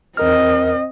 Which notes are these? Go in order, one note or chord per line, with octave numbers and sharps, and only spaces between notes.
E2 C4 A#4 D#5 F6